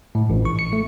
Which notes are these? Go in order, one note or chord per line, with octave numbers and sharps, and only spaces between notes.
A2
A1
C#6
C#7
A3